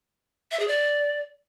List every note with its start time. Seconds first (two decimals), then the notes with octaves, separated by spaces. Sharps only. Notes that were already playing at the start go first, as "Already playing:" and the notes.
0.51 E5
0.60 G#4
0.68 D5